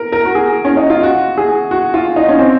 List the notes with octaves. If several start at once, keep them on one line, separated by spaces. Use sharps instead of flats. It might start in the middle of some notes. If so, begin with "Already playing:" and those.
Already playing: A#4
A#4
F#4
G#4
C#4
D#4
F4
F#4
G#4
F#4
F4
D#4
C#4
C4